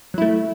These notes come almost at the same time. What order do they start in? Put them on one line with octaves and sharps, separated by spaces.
F#3 E4 A3